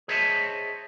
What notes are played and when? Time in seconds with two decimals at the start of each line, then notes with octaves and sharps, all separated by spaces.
0.08 G#4 C5 C#5 D#5 E5 A5